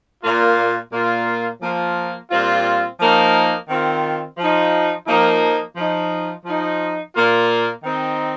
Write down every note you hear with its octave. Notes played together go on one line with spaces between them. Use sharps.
A#2 A#3 F4
A#2 A#3 F4
F3 A#3 F4
A#2 G3 C4 F4
F3 A#3 D#4
D#3 C4 F4
F3 D#4
F3 A#3 D#4
F3 D#4
F3 D#4
A#2 A#3 F4
D#3 C4 D#4